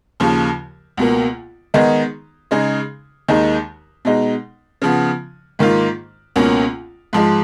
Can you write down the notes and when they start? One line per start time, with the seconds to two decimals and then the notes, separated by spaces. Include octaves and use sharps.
0.20 D#2 C#3 F3
0.97 C#2 B2 A#3
1.74 D#3 G#3 B3 D#4 G#4
2.51 C#3 G#3 D#4 G#4
3.28 D#2 D#3 G#3 D#4
4.05 B2 G#3 D#4
4.82 C#3 F3 B3
5.59 G#2 D#3 A#3 F4
6.36 C#2 B2 A#3 C#4
7.13 G#2 F3 G#3